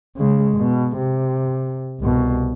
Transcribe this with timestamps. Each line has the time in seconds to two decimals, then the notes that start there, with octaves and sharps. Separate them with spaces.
0.17 C#3 G#3
0.58 B2
0.97 C3
2.00 C2 B2